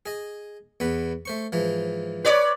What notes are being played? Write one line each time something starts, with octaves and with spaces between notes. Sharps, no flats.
G#4 D#5
E2 B3 B4
A3 C5 C#6
G#2 E3 F3
B4 C#5 D5